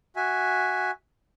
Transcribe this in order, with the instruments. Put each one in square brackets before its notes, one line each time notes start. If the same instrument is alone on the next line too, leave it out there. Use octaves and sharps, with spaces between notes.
[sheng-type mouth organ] F#4 E5 G#5